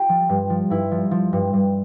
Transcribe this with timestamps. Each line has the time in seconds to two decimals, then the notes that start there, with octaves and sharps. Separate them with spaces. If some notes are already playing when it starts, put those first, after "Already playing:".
Already playing: F4 G4
0.09 F3
0.29 G2
0.50 F3
0.70 G2 E4
0.91 F3
1.11 F3
1.33 G2
1.53 G2